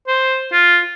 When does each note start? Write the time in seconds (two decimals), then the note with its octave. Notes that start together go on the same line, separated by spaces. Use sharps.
0.07 C5
0.53 F4